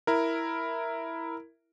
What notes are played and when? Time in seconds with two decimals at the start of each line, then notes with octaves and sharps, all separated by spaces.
0.07 E4 A#4